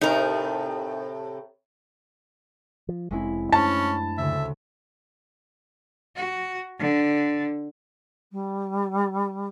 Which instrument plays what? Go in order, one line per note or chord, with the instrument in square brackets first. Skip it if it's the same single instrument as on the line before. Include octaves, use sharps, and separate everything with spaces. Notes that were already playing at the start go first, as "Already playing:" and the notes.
[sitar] A2 C3 A4 [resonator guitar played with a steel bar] D#4 A#4
[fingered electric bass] F3
[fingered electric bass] F1 G#2 C4 [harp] G#3 C#4 E4
[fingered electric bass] F#2 A3 D4 [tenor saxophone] C#4 [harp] C5 B5 [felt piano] A5
[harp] D2 C#3 [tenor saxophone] E5
[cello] F#4
D3
[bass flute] G3